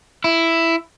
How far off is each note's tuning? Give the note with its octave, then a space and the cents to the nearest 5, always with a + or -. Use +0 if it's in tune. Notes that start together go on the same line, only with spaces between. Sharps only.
E4 +5